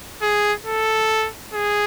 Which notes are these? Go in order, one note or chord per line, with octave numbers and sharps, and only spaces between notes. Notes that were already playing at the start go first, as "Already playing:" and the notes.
G#4
A4
G#4